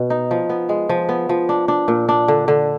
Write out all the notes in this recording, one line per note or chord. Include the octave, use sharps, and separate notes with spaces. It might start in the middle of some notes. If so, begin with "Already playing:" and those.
Already playing: B2 B3
D#4
F3
B3
G#3
F3
B3
F3
D4
D4
A#2
D4
D3
D3